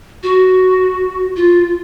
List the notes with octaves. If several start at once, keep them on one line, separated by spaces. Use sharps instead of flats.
F#4
F4